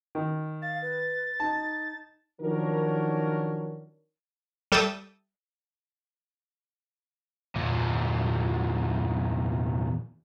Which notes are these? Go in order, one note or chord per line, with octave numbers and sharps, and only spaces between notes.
D#3
F5 A6
B4
D#4 A5
D#3 F3 F#3 C#4 D4 A#4
G3 A4 E5 G5 D#6 A6
E2 A#2